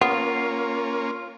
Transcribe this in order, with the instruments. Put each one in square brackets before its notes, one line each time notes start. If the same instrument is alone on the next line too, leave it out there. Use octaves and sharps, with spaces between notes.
[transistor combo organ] A#3 C#4 [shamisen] B3 [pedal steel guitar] F4